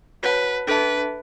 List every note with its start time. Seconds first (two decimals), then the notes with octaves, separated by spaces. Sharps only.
0.23 F#4 B4 C#5 F#5 A5
0.67 D4 A4 B4 E5 A5